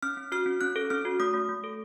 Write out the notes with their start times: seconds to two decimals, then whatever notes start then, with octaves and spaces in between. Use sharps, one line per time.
0.03 C#4 F6
0.17 C#4
0.32 F#4 F6
0.46 C#4
0.61 C#4 F#6
0.76 A4
0.90 C#4 F6
1.05 F#4
1.20 A3 D#6
1.34 A3
1.49 A3
1.64 A4